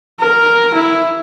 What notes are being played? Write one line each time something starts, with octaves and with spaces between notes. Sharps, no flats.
A#4
E4